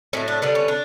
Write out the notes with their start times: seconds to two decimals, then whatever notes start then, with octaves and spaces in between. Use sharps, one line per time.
0.13 A2 F#3 A3 C#4
0.28 D4
0.42 D3 G3 B3 D4
0.55 C#4
0.68 D4